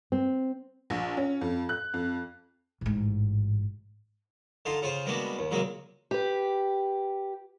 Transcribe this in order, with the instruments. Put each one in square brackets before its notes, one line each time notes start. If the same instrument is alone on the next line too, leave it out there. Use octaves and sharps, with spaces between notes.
[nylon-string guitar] C4
[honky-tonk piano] A#1
C#4
F2
F#6
F2
[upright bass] A1 G#2
[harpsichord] D3 D#4 F4 C6
C#3 F4 G#4 C5
G3 G#3 A#3 B3 D4 F#4
D#2
A#2 C#3 F#3 G#3 A#3 C4
[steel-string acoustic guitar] G4 B4